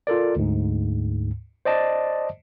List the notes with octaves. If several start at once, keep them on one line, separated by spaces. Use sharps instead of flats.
F4 A4 A#4 D5
D2 G#2
C5 D5 D#5 A5